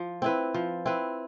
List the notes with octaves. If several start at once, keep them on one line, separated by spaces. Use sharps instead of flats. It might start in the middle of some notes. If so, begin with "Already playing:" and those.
Already playing: F3
C4 E4 B4
F3
C4 E4 B4